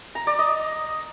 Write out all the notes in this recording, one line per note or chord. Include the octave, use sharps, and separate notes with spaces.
A#5
D5
D#5